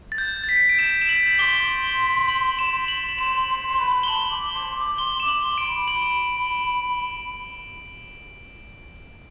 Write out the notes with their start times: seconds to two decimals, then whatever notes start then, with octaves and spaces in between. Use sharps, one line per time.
0.12 A6
0.18 G6
0.44 A6
0.49 B6
0.69 D7
0.79 E7
1.01 E7
1.09 F#7
1.38 C6 D6 G7
2.29 F#7
2.59 E7
2.88 F#7
3.09 F#7
3.18 C6 E7
3.48 C6
3.68 C6
3.79 B5
4.03 G7
4.08 A5 F#7
4.30 D6
4.53 C6
4.75 D6
4.98 C6 G7
5.20 D6 E7
5.28 F#7
5.43 C6
5.58 D7
5.66 B5
5.88 F#7